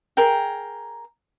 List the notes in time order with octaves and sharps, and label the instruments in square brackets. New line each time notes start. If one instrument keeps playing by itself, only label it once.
[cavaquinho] G#4 A#4 G5